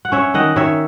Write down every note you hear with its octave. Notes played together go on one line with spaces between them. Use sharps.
F#5
C#4 C#5 E5
D#3 D#5 F#5
D#3 C#5 E5